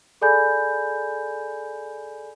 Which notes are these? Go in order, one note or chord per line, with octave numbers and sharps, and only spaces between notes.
G#4 A4 D5 G#5 B5 G6